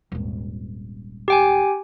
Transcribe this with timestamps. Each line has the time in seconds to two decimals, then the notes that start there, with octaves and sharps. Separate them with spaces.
0.12 D#1 G#1
1.28 G4 G5 G#5